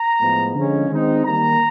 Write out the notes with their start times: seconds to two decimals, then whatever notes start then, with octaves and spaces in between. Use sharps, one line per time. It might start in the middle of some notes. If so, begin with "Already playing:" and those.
Already playing: A#5
0.20 A2 F3 G#3 B3
0.55 D3 F3 G#3 C#4
0.90 D#3 G#3 C4 D#4
1.25 D#3 G3 A#3 A#5